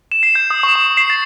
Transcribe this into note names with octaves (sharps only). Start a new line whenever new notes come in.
E7
C7
G6
D#6
C#6
C#6
C7
A6